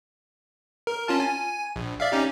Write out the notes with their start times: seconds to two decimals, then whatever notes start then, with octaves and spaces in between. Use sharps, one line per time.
0.87 A#4
1.08 C#4 F4 A5
1.20 G#5
1.76 A#1
2.00 D5 E5 F5
2.12 C#4 D#4 G4